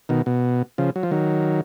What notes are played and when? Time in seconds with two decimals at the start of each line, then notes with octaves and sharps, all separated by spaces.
0.09 B2 D#3
0.26 B2
0.78 C#3 F3
0.96 F#3
1.03 F3
1.11 D#3 F#3